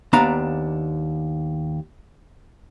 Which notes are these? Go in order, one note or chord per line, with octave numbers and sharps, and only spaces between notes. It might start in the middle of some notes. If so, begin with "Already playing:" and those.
D#2 B3 D4 F5 A#5